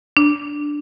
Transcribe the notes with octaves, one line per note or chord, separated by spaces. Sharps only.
D4